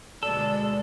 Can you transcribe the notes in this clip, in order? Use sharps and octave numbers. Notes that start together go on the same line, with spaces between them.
D2 B2 G#3 A4 D5